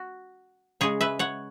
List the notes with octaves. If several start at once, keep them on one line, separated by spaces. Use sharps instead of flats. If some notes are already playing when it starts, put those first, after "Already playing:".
Already playing: F#4
C#3 G#3 G#4 C#5
B4 E5
C#5 F#5